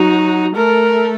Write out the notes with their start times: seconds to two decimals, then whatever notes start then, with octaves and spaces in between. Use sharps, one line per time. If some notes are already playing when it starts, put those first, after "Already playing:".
Already playing: F#3 D#4 F#4
0.56 A3 A4 A#4